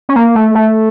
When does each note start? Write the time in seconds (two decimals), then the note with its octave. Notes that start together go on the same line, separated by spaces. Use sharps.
0.09 C#4
0.16 A#3
0.35 A3
0.55 A3